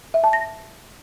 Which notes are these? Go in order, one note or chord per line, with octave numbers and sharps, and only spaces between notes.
E5
A5
A#6